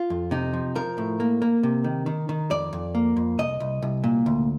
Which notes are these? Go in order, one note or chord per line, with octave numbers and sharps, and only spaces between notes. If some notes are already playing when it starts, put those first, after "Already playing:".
Already playing: F4
F2
C3 D#4
F3
F3 A#4
A2
A#3
A#3
C3
D#3
D#3
D#3
F2 D5
F2
A#3
F2
C2 D#5
C2
C2
A#2
D2